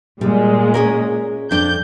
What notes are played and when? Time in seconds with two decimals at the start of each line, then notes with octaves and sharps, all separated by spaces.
0.21 A#2 G3 G#3
0.74 C#4 G#4 A#4
1.51 F2 D4 G6